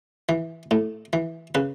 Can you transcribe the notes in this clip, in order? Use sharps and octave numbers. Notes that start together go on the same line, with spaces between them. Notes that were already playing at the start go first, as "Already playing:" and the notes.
E3
A2
E3
C#3 B4